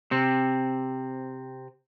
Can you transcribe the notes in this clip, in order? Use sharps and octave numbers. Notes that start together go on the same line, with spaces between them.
C3 C4